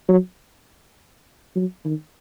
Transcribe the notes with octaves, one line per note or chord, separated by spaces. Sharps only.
F#3
F#3
D#3